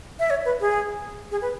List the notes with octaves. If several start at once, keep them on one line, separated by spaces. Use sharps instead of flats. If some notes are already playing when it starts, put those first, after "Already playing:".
E5
C#5
B4
G#4
G#4
B4